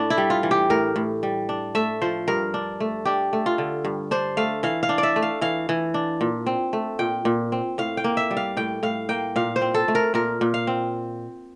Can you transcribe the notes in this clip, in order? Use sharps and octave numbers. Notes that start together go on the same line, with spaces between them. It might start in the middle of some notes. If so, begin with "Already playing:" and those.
Already playing: A2 D4
E4
G3
F4
E3
G4
A2 A#4
A2
G3
D4
A3 E5
F3 C5
G2 A#4
D4
A3
D4 G4
A3
F4
D3
G2
D4 C5
A3 F5
E3 F5
F5
D4
D5
E5
A3
F5
E3 F5
E3
D4
A#2
C4
A3
A#2 G5
A#2
C4
A2 F5
G5
A#3
E5
G3
F5
A2 G5
A2 F5
A#3 G5
A#2 F5
C5
C4
A4
A3
A#4
A#2 A#4
A#2
F5
C4